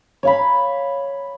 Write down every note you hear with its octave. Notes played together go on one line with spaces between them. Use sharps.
C#5 F5 B5